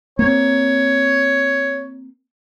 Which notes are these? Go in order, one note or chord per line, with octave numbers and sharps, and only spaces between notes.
A#3 C4 C#5